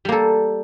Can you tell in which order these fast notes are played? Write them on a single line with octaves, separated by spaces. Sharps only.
G3 A#3 A4